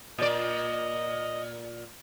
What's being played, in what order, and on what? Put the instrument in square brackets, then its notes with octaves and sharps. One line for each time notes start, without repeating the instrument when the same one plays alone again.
[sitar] A#2 D5 [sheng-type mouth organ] D#5